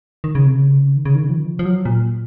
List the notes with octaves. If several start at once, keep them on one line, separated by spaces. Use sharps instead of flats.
D#3
C#3
C3
C#3
D#3
C#3
D#3
C#3
F3
D#3
F3
F3
F#3
A#2